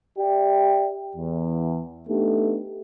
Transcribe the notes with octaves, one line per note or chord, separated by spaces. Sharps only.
G4 D5 E5 G5
E2
A3 B3 D4 D#4 G4 A4